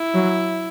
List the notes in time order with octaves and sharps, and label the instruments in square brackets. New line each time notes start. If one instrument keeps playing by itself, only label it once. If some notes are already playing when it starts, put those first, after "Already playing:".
Already playing: [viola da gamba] E4
[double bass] F#3